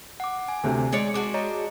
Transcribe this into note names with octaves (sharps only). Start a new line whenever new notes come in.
F#5 D6
G#5
D2 C3
G#3 G#4 C#5 D5
D4 F#4 G#4 D6
C#5 D#5 A#5